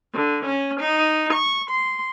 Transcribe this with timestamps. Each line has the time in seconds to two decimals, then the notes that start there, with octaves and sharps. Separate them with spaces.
0.13 D3
0.45 C#4
0.80 D#4
1.33 C#6
1.68 C6